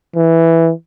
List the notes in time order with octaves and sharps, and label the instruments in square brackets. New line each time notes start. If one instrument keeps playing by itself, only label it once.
[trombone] E3